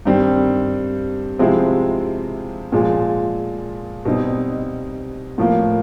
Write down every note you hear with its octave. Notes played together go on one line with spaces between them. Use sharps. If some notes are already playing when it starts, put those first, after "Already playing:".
G2 D#3 G3 C4
C3 F3 G#3 C4 E4
A#2 F3 G#3
B2 G3 C4 D#4
A2 F3 A#3